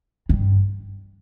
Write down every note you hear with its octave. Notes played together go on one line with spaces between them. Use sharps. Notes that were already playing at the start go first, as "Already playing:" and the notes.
G2